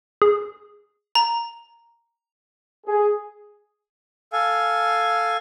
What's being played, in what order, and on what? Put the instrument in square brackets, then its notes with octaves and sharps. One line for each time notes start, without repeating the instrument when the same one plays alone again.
[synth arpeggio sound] G#4
[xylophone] A#5
[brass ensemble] G#4
[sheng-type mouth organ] A4 F5 G#5